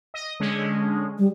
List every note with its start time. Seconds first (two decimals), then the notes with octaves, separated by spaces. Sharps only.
0.14 D#5
0.40 D3 G#3 C#4
1.18 G3